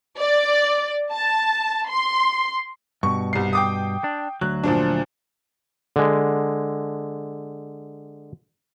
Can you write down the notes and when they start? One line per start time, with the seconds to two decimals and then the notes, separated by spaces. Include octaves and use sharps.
0.18 D5
1.13 A5
1.88 C6
3.03 G2 B2 C#6
3.33 C2 C7
3.53 G5 D6 D#6
4.04 D4
4.41 D2 F#3 F#6
4.64 A#2 F3 D4
5.96 D3 G#3